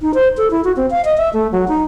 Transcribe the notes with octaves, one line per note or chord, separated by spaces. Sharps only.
D#4
C5
A4
E4
F#4
C4
F5
D#5
E5
A3
F#3
D#4